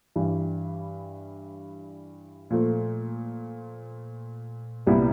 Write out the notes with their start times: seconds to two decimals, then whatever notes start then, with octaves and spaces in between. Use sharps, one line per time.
0.16 G2 E3 G3
2.50 A#2 F3 A3
4.87 C2 A#2 G3 B3 E4